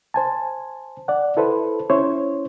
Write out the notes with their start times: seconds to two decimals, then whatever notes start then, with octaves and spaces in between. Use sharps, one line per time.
0.14 C5 G#5 A5
1.08 D5 F#5
1.37 E4 A4 B4 C5
1.90 C#4 E4 C5 C#5